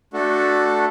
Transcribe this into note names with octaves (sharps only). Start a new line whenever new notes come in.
A3 D4 F#4 A4